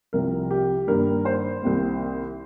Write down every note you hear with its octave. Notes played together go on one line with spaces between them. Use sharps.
C2 C3 F3 A#4
G4
G2 D#3 G3 A#3 A#4
C5
C2 C3 D#3 A#3